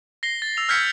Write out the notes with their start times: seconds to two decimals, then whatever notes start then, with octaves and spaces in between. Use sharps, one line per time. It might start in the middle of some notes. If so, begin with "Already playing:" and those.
0.23 A#6 C7 G7
0.42 A6
0.57 E6 F7
0.69 E6 F6 G6 G#6 B6 C#7